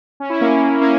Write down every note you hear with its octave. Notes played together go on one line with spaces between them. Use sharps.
C#4
E4
A#3 C#4
A#3 C#4